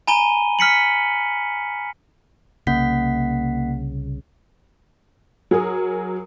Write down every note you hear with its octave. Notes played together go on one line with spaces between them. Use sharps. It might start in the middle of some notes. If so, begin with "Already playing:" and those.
G#5 A#5 B5 D#7 G7
F6 B6 C#7 F#7
C2 C#3 A#3 F#5 B6
F#3 G#4 A#4 D#6